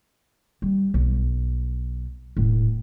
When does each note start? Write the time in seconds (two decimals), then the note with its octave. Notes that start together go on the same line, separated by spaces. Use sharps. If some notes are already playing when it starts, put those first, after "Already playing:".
0.62 G3
0.94 B1
2.37 E1 A2